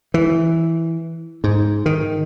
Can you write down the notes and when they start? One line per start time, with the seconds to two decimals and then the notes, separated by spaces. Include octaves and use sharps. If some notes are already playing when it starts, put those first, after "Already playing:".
0.14 E3
1.44 G#2
1.86 D#3